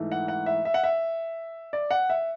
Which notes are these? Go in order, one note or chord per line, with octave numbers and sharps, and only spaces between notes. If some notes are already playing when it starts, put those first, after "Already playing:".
Already playing: G#2 E3 A3
F#5
F#5
E5
E5
F#5
E5
D5
F#5
E5